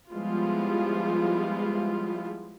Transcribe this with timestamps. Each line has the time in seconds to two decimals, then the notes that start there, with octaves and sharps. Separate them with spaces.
0.11 F3 G3 G#3 B3 E4 F4